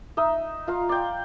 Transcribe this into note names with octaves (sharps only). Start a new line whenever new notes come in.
D#4 D#5 E5
F4 F5 A#5
D5 G5